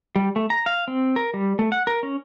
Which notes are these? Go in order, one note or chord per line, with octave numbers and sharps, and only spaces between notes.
G3
A3
A#5
F5
C4
A#4
G3
A3
F#5
A#4
C#4